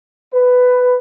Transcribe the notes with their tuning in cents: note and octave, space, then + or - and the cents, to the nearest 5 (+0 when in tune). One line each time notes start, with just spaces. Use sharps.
B4 +10